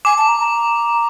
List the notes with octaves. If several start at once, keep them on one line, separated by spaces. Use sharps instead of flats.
G#5 D6
A5
A#5
A#5